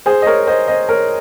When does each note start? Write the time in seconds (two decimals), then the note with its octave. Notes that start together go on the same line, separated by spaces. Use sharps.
0.06 G#4 C5
0.22 D#5
0.26 A#4 C#5
0.47 C5 D#5
0.67 C5 D#5
0.89 A#4 C#5